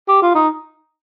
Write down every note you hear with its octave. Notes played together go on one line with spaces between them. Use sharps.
G4
F4
D#4